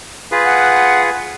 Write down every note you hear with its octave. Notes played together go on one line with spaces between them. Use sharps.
F4 G#4 B4
F#5